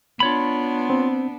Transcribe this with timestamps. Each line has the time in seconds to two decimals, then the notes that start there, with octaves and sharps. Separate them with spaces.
0.20 B3 D4 F4 C#5 B5
0.90 C4